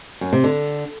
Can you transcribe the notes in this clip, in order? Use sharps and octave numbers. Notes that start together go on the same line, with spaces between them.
F#2
C3
D3